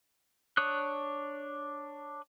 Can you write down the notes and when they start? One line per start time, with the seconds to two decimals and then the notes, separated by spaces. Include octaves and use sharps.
0.57 D4 C#5 D#6 F#6